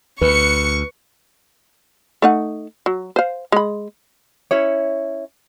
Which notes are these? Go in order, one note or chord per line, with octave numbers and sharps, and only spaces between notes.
D2 B4 C#6 C#7
A3 D#4 F#5
F#3
C5 F5
G#3 B5
C#4 E4 C#5